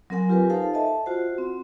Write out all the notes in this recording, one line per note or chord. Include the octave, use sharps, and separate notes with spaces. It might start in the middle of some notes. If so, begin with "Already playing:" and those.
F#3 C4 A#4 F#5 G#5
F4 G4 A#4 B4 G#5
D#4 A4 C5 F5 A5
D#5 E5 A5
F4 F#4 C5 F#5
C4